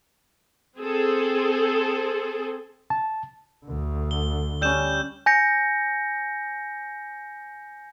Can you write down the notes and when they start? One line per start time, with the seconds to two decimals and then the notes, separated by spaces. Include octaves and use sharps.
0.78 C4 G#4 A4
2.90 A5
3.66 D2 D3
4.11 G7
4.61 G3 C#4 E6 G6 E7
5.26 G#5 G6 A#6 C#7